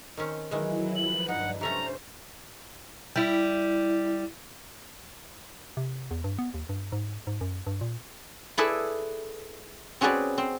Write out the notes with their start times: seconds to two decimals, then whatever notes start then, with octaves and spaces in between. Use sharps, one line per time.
0.17 D#3 C4 C#4
0.51 D#3 E3 F#3 G#3 E4
0.96 F3 B4 F#7
1.28 G2 D4 D#4 F#5
1.61 C3 A3 C#4 C5 A#5
3.16 G3 E4
5.77 C3
6.11 E2
6.24 G2
6.39 B3
6.54 D#2
6.69 G2
6.92 G#2
7.27 G#2
7.41 F#2
7.67 G2
7.81 A#2
8.58 E4 G#4 A4 B4 D5 E5
10.01 C4 C#4 F#4 G#4 B4 D5
10.38 C4